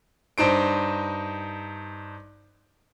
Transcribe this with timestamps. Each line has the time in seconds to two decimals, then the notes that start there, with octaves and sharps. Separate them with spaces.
0.38 G2 D#4 C5 D7